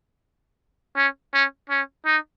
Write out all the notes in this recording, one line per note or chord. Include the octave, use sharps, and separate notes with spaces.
C#4
C#4
C#4
D#4